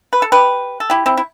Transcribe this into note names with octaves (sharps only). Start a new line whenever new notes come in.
B4
A4
G4 B4
A4
E4 G4
C4 E4
E4